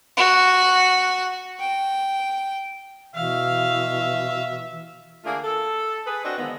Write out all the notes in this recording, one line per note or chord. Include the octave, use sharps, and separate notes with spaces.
F#4
G5
B2 E3 E5 F5
D3 A3 A#3 D4 F4 G#4
A4
G#4 B4
C4 D4 F#4 D#5
D3 D#3 F3 G#3 B3